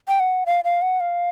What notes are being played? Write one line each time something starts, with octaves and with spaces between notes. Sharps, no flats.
G5
F#5
F5
F5
F#5
F5